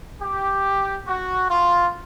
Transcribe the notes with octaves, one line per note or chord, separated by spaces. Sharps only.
G4
F#4
F4